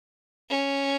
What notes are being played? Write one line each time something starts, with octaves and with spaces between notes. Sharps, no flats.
C#4